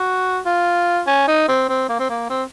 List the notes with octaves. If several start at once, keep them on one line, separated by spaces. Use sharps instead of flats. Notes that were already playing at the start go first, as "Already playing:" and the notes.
Already playing: F#4
F4
C#4
D#4
C4
C4
A#3
C4
A#3
C4